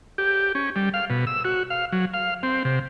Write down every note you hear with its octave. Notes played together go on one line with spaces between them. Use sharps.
G4
C#4
G3
F5
B2
E6
F#4
F5
F#3
F5
C4
C3